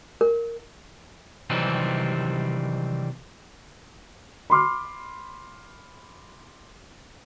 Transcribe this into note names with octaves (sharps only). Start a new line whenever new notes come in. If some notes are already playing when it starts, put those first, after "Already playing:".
A#4
C3 D#3 E3 F#3 G3 C4
B5 C6 D6 F6